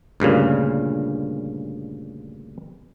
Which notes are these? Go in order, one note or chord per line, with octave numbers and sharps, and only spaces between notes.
D2 G2 A#2 C#3